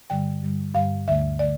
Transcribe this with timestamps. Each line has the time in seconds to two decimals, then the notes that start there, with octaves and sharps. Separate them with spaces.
0.10 G2 D3 G3 G5
0.42 G2 D3 G3
0.75 G2 D3 G3 F5
1.08 D2 D3 A3 E5
1.39 D3 A3 D5